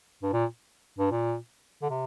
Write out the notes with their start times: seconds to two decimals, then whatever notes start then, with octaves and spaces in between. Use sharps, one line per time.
0.23 G2
0.33 A#2
0.99 G2
1.11 A#2
1.82 D3
1.90 C3